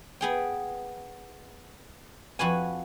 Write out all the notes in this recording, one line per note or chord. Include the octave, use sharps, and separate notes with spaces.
B3 G#4 G5
F2 F#4 B4 G#5